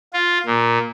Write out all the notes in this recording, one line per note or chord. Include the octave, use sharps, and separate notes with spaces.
F4
A#2